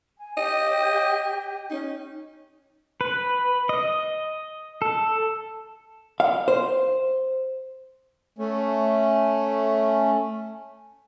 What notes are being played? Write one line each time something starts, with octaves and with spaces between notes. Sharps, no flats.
G#5
G4 D#5 G5
C#4 D#4
B4
D#5
A4
F5
C5
A3 C#4